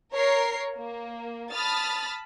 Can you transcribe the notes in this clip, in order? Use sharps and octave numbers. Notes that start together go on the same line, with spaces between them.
A#4 C#5 C7
A#3
A5 B5 D#6 F6 A6